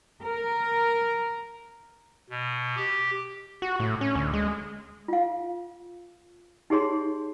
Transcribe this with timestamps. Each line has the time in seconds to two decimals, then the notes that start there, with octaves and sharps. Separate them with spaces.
0.21 A#4
2.30 B2
2.77 G4
3.62 F#4
3.80 A2
4.01 C#4
4.15 D2
4.34 G#3
5.08 F4 F5
6.70 D#4 G4 G#4 C#5 C6